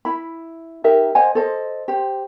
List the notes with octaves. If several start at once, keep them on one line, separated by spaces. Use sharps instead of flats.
E4 B5
D#4 G4 A#4 E5
C5 D#5 F#5 G#5
A4 C5 D#5
G4 C5